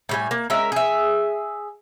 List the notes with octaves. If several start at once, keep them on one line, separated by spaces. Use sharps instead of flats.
A2 G3 G#5
A#3
G#3 C#4 A#4 E5
G#4 E5